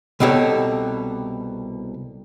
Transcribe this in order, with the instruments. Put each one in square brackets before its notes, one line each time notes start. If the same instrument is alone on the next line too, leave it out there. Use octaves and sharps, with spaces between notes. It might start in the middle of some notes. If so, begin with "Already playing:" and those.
[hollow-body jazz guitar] C2 B2 D#4 G4 A4 C#5